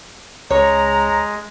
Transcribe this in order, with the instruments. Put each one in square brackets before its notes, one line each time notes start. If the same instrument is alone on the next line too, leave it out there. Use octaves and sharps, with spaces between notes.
[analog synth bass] C#2 [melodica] G#3 [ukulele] C#5 [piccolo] A#5